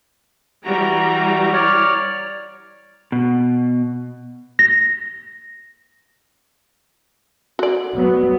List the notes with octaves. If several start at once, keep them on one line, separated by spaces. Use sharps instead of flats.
E3 G3 F#4 A#5
C#5 D5 F6
B2
A#6
F#4 D5
F#3 B3